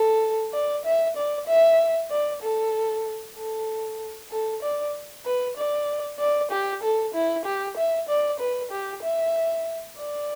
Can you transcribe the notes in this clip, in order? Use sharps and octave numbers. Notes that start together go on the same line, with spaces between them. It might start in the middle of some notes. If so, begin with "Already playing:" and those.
Already playing: A4
D5
E5
D5
E5
D5
A4
A4
A4
D5
B4
D5
D5
G4
A4
E4
G4
E5
D5
B4
G4
E5
D5